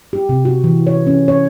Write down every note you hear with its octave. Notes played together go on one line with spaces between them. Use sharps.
G4
C3
F#4
E3
C#5
C#4
C#5